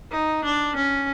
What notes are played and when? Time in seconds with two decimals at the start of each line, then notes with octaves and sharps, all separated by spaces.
0.12 D#4
0.44 D4
0.76 C#4